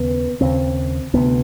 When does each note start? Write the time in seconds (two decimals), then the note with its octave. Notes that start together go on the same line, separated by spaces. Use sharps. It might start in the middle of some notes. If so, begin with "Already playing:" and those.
Already playing: D#2 C#3 B3
0.41 D#2 C#3 C4
1.14 D2 C3 B3